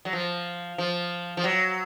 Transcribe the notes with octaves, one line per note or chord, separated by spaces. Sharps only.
F#3
F3
F3
F3
F#3